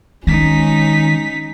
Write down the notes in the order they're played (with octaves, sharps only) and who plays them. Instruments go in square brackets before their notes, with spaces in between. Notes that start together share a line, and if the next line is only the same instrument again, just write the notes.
[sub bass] D#3 [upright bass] G#3 [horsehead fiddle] C#4 [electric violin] D#4 B6